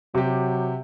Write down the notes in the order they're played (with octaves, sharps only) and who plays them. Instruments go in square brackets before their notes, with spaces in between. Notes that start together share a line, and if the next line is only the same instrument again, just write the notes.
[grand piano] C3 G4 [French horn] F#3